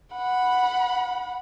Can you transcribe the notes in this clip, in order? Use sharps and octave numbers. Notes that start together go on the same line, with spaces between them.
F#5 B5